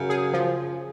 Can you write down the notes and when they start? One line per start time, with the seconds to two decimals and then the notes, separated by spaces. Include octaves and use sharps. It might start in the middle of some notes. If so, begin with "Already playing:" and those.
Already playing: F#2 C#3
0.10 G#4
0.33 F3